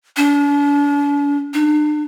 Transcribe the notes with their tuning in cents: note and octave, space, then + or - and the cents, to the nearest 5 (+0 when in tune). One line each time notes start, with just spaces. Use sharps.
D4 -40
D4 +40